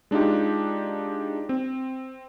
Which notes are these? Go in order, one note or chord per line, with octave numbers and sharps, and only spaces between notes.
G#3 D4 D#4 F4 G4
C4